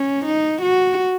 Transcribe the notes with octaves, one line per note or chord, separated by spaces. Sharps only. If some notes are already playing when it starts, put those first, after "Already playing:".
Already playing: C#4
D#4
F#4